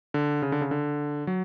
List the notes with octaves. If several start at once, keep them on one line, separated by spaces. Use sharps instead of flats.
D3
C#3
D3
C#3
D3
F#3